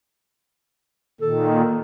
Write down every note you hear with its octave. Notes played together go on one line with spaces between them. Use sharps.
A#2 D#3 A4